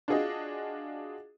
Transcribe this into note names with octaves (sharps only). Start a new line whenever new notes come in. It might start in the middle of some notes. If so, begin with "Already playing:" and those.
D4 F4 F#4 G#4 D#5